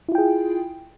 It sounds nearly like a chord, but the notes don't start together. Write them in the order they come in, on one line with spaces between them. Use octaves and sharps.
E4 F4 G5 G#4